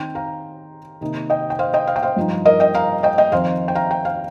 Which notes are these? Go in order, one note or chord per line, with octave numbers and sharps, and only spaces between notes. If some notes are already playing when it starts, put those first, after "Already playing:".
Already playing: D#3 C4 D#4 G5 C6
F5 A#5
C3 D#3 A#3 D#4
D#5 G5
G5
C5 F5
D#5 G5
F5
G5
C5 F5
G2 F3 D#4
A#4 D#5
D#5 G5
F5 A#5
D#5 G5
D#5 G5
F2 D#3 C4 D#4 C5 F5
G5
F5 A#5
G5
F5